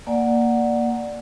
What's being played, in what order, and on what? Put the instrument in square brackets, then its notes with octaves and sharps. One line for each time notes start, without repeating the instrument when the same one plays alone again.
[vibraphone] A#3 D5 F#5 G#5